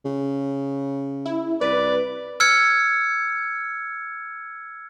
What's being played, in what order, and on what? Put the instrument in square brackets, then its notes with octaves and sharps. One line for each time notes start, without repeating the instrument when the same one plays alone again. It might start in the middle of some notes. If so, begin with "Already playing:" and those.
[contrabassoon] C#3
[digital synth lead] E4
[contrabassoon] C2 [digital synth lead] B4 [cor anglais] D5
[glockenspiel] E6 F6 G#6 C#7